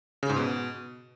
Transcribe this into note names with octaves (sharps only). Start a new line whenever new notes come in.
C#3
G#2
B2